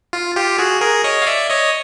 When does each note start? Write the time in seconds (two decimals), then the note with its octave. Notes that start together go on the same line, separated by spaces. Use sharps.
0.13 F4
0.36 F4 G4
0.58 F#4 G#4
0.81 G#4 A#4
1.04 C#5 D#5
1.22 F5
1.26 D5 E5
1.50 C#5 D#5